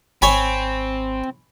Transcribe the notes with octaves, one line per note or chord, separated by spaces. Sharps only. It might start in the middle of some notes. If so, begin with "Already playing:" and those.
G#1 C4 C#5 G#5 B5